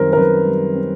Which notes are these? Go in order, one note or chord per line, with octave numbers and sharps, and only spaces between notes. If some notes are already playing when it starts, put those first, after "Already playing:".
Already playing: F#2 D#3 G3 C4 A#4 C5
A#4
F#2 B4
G3
C4